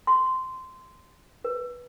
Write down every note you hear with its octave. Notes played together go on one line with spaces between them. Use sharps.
C6
B4